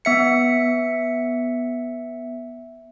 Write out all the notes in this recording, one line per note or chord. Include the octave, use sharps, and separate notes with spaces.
B3 E5 C#7